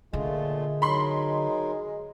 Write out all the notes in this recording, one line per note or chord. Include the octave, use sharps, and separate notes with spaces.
A#2 D3 G#3 A3 F4
F#3 D#4 A#4 B5 C6